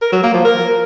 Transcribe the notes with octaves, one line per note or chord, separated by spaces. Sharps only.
A#4
F#3
A#3
F3
A#4